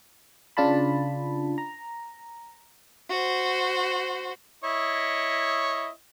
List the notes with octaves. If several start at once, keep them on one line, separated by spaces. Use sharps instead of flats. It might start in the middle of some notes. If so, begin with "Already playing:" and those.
C#3 D4 F4 A5 B5
A#5
F#4 C5
E4 C#5 D#5